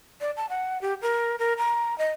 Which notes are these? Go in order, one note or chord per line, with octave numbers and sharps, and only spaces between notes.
D5
A5
F#5
G4
A#4
A#4
A#5
D#5